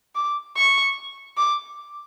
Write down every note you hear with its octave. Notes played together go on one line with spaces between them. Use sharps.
D6
C#6
D6